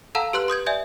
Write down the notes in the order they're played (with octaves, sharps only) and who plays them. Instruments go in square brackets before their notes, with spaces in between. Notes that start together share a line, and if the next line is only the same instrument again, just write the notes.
[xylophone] A4 F5 F#5 A5 A#5 E6
G4 B4 C6 F#6 F#7
C6 D#6 G6 G#6
D5 E5 G#5 G6 G#6